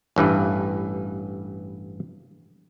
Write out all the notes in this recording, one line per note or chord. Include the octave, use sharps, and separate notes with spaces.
A1 G2 E3 B4